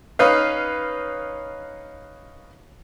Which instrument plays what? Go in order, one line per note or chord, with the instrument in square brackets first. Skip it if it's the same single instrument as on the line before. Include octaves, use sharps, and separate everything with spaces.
[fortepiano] C#4 D#4 B4 F5